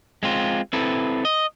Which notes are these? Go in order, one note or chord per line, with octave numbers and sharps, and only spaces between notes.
G#3 C4 F4
C4 E4 A4 B4
D#5